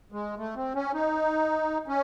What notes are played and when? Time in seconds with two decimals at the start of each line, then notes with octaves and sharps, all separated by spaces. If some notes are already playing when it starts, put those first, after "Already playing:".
0.12 G#3
0.38 A3
0.56 C4
0.75 C#4
0.93 D#4
1.88 C#4